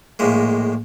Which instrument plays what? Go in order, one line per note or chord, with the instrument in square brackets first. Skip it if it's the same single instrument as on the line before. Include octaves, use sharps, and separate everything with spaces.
[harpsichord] A#1 A2 G#3 A#3